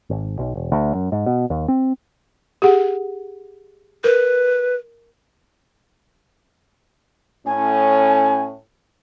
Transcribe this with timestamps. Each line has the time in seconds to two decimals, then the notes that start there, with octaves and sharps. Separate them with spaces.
0.10 G#1
0.39 B1
0.56 E1
0.72 D2
0.95 F#2
1.12 G#2
1.26 B2
1.50 D#2
1.68 C4
2.62 G4 G#4 F#5
4.04 A#4 B4
7.46 A2 C#4 G#5